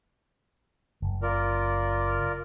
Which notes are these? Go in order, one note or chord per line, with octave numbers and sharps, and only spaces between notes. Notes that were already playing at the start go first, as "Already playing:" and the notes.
F#1
F4 A#4 D5